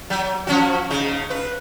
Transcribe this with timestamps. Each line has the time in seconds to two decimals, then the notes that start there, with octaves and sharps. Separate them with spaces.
0.10 F#3
0.47 F3 C#4 F#4
0.90 C#3 D#4
1.30 B4